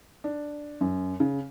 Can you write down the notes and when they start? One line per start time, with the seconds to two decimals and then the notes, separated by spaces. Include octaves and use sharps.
0.24 D4
0.81 F#2
1.20 C#3